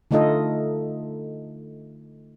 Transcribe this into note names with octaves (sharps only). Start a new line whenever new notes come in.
D3 A3 D#4 F4 A4 D#5